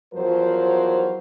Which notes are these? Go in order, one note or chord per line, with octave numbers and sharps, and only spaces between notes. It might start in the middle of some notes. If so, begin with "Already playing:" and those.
E2 F3 F#3 A#4 C5